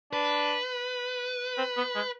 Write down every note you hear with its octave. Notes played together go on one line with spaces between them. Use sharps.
D4 B4
C4
B3
G#3